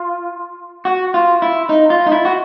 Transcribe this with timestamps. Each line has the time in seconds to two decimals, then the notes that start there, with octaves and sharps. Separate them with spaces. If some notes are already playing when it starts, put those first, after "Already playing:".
Already playing: F4
0.85 F#4
1.14 F4
1.42 E4
1.69 D#4
1.90 F4
2.07 D#4
2.12 E4
2.25 F#4